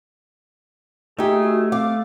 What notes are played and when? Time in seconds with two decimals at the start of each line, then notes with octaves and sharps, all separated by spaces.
1.19 A3 D#4 G4 G#4
1.42 F#4
1.72 C4 F5 D6